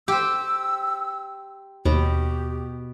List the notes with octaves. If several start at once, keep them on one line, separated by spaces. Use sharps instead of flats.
G4 C5 E6
D#2 B2 G4